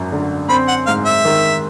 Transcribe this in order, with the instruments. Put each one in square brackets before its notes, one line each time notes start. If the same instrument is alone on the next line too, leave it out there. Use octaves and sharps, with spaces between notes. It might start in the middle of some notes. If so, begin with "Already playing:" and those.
Already playing: [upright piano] G#1 F#2
D3
[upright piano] C4 [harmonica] B5
[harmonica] F#5
[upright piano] G#2 [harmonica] F5
[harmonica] E5
[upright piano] D#3